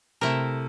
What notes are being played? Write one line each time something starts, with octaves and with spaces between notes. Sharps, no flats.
C3 A3 E4 A#4